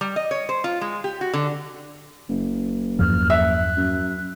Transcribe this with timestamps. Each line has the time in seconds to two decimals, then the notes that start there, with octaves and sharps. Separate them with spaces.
0.01 G3
0.16 D#5
0.31 C#5
0.49 C5
0.64 F4
0.81 G#3
1.04 G4
1.21 F#4
1.33 D3
2.29 F#1
2.99 E2 G2 F3 F6
3.30 E5 F#6
3.77 F#2